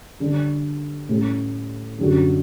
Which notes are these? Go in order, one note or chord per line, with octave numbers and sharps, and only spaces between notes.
D3 G3 D4 G4
A2 G3 C#4 G4
F#2 D3 G3 D4 F#4